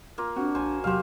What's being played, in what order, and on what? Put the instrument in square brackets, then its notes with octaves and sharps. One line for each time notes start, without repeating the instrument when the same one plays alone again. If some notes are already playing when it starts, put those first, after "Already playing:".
[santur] A#3 F4
[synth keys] C4 [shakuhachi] D4 [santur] F#4
[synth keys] A#1 [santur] C5 G#5
[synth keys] E2 C3 F#3 [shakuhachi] G4 [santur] C5 F5